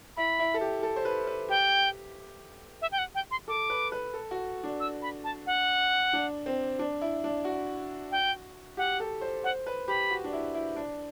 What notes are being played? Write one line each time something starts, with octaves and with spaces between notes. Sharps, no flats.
E4 B5
E4
A4
G4
A4
C5
B4
B4
G4 G5
E5
G5
F#5
G5
C6
A4 D6
B4
B4
A4
F#4
D4
E6
B5
A5
F#5
D4
C4
D4
E4
D4
F#4
G5
G4 F#5
A4
C5
C5 F#5
B4
G4 B5
F#4
D4
E4
E4
D4